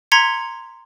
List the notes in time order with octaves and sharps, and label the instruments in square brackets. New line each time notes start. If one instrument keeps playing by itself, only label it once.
[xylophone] A#5 C6 G#6 B6 C#7